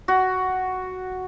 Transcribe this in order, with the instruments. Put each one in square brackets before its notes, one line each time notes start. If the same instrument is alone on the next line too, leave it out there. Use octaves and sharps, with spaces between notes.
[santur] F#4